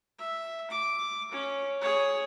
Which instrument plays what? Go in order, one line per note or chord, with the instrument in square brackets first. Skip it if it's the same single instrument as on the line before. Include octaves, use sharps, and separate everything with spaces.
[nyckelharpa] E5
D6
C#4
G#4 C#5